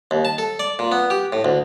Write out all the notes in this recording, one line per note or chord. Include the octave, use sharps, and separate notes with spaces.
D#2
A5
A4
D5
A#2
B3
G4
A2
D2